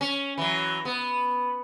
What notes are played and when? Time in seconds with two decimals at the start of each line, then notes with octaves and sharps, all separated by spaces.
0.01 C#4
0.38 E3 F#3
0.85 B3